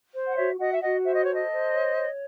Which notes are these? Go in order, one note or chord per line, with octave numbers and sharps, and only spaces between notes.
C5
F#5
F#4 C#5 E5
F#4 D#5 F#5
E5
F#4 D#5 F#5
C5 E5
D#5
A4 C#5
D#5
C5
C#5
C#5